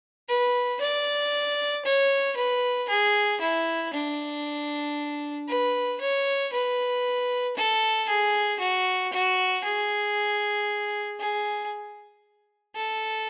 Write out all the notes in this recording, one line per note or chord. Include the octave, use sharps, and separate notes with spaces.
B4
D5
C#5
B4
G#4
E4
D4
B4
C#5
B4
A4
G#4
F#4
F#4
G#4
G#4
A4